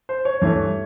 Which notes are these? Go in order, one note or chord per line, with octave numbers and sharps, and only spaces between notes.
C5
C#5
G2 E3 A3 C#5